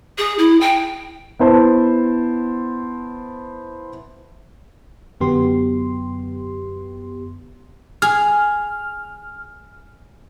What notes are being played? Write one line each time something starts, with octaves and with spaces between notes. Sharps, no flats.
G#4
E4
G5
B3 E4 C5 A5
F#2 D3 F#3 B3 G4 C6
G#4 F6